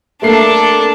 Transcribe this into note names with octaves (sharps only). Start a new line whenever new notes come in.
A3 A#3 D4 A4 C7